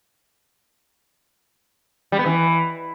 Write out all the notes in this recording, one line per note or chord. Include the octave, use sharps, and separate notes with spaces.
G3
B3
E3